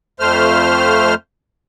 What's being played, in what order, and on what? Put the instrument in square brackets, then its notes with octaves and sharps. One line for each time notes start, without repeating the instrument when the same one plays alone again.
[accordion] F2 A3 C5 F6